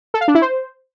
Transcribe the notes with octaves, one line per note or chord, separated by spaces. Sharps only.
A4
F5
D4
E4
C5